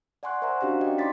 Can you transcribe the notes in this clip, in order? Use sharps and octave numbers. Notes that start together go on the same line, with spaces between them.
D5 F#5 G#5 C6 C#6 F#6
A#4 C5 E5 F#5 A#5
C#4 D4 F#4 G4 F5 A#5
C#4 D5 D#5 G5
D#4 B5 C6 D6 A6 B6